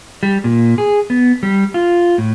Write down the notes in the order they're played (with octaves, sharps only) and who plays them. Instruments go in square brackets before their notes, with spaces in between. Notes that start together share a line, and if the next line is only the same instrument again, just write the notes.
[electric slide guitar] G3
A#2
G#4
B3
G3
F4
A2